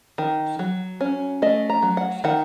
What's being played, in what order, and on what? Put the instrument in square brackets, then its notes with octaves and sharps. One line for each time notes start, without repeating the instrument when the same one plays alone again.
[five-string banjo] D#3
F#3
C#4
A3 D#5
A#5
F#3
F#5
D#3 F#5